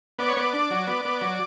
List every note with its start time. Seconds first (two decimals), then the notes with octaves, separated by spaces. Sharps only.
0.19 B3 D5
0.28 C#5
0.37 B3 D5
0.53 D4
0.71 F#3
0.87 B3
1.05 B3
1.21 F#3